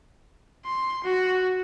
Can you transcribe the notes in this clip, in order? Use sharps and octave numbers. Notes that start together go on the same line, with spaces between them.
C6
F#4